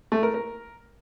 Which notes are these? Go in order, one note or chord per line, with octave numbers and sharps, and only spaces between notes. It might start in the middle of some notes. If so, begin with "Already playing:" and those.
A3
A#4
A#4